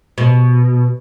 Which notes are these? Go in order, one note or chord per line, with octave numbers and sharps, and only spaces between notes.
B2